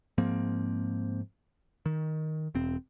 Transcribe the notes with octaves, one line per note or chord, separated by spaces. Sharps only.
G#2 F3 A#3 C4
D#3
E1 C4